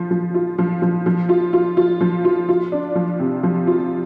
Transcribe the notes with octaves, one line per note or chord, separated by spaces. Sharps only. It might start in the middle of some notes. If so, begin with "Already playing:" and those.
Already playing: F3 F4
F3
F4
F3
F3
F3
F4
F4
F4
F3
F4
F4
D4
F3
C3
F3
F4